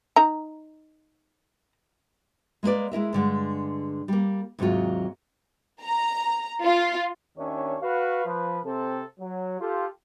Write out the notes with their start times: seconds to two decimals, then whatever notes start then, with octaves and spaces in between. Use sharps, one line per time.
0.16 D#4 A#5
2.63 G#3 A#3 B3 B4 D5
2.92 G#3 E4 A#4 E5
3.13 G2 D3 G#3
4.08 G3 A#3
4.59 D#2 G#2 C3 F#3 F4
5.82 A#5
6.64 F4
7.38 D#2 D#3 C#4 D4 C#5 E5
7.82 F#4 B4 F5
8.26 F3 B4
8.65 C3 C4 A4
9.20 F#3
9.60 F4 G4 A4